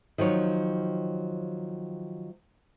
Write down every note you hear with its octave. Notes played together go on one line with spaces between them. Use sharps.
D#3 F3 F#3 C#5